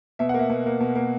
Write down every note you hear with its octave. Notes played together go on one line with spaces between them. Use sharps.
B2 E5
F#5
A#3
E5
B2
A#3
B2
A#3